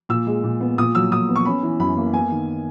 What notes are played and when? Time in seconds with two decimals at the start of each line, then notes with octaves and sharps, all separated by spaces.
0.09 A#2 E6
0.27 G#3
0.44 A#2
0.61 B3
0.78 A#2 D#6
0.95 F#3 E6
1.11 A#2 D#6
1.29 B3
1.36 C#6
1.45 C#4 B5
1.63 E3
1.80 F#2 B5
1.97 A#3
2.13 B3 G#5
2.31 D#3